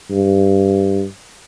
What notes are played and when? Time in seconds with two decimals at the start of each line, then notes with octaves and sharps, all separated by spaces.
0.11 G2